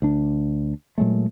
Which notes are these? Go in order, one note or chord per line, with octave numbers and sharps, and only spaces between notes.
D2 D4
A#2 F#3 G#3 A3